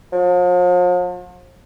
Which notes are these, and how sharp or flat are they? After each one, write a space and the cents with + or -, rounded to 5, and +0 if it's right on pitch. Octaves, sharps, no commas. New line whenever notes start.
F3 +45